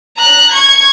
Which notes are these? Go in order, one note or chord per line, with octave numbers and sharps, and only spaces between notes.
A#5 F#6
C#6 G#6